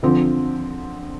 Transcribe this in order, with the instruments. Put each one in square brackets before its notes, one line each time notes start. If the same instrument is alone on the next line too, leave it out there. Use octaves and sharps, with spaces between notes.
[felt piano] D3 F3 C4